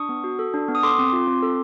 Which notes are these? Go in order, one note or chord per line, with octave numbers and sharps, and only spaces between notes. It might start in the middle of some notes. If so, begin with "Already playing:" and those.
Already playing: D4 C#6 D#6
B3
F#4
A4
D4
B3
D#6
A4 C6 D6
C4
F4
C4
A4